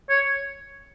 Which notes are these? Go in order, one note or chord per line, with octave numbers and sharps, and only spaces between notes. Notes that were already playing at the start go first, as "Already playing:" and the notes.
C#5